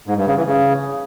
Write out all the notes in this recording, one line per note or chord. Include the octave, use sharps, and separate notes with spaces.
G#2
G2
C#3
E3
C#3